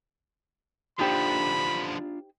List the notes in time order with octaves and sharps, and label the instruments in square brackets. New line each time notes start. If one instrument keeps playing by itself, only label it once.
[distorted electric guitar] D3 F3 [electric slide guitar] D4 F4 [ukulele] D#4 G4 C5 [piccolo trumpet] B5